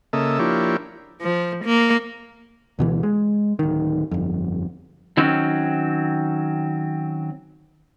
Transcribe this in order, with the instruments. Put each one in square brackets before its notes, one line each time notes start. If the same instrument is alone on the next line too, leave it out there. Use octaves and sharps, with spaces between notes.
[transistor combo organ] C#3 A#3 A4 D#5 E5
F3 A#3 D4 E4 G4 C#5
[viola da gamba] F3
A#3
[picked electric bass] D2 B2 E3
G#3
D1 D#3
G1 F2
[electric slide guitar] D#3 F#3 C4 C#4